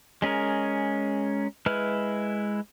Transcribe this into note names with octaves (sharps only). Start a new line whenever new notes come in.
G#3 C#4 G#4 A#4
G#3 E4 B4 F6